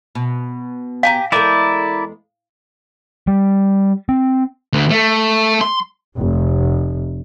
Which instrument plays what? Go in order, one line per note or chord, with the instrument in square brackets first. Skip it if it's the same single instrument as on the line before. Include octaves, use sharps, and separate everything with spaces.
[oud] B2
[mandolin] G4 G#5 A#5 [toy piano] F5
[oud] E2 G#3 A4 [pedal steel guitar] E4 D5 [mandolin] A#4 G#5 G6
[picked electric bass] G3
C4
[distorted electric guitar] D2
A3
C6
[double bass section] F1